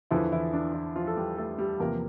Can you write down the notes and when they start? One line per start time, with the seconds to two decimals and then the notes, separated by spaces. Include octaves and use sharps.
0.11 E2 D3 E3 F3 E4
0.32 E3 E4
0.53 D4
0.74 E3 E4
0.96 F3 F4
1.07 A4
1.17 G3 G4
1.37 A3 A4
1.58 G3 G4
1.80 E2 C3 F3 A#3 A#4